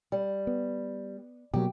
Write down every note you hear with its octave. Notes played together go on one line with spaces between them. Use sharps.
G3
B3
B2 F#3 A#3 G4